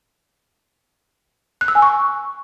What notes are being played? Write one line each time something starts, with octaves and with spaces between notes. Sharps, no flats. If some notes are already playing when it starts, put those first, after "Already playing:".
F#6
E6
G#5
C#6